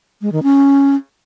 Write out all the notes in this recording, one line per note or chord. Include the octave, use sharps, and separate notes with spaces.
G#3
D#3
C#4